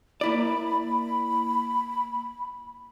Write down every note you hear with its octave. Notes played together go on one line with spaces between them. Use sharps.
A#3 E4 D5 B5